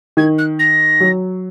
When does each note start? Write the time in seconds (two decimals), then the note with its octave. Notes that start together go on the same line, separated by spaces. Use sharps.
0.17 D#3 G#6
0.38 F#6
0.59 A#6
1.00 F#3